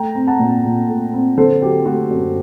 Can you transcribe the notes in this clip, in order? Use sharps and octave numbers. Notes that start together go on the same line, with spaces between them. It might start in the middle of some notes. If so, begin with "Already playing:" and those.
Already playing: A3 G5 A#5
C4
F#5 A5
A#2
A#2
A3
C4
D3 A4 C5
F#3 G4
A3 F#4
F#2